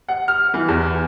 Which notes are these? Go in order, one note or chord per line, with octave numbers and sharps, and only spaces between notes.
F#5
F6
E3
E2